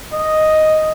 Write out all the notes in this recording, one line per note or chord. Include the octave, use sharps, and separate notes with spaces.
D#5